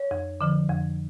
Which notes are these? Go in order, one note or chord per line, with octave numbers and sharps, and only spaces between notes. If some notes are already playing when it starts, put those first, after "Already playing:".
Already playing: C#5
F2
D3 F3
F2